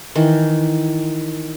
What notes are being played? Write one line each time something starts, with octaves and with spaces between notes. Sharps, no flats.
D#3 E3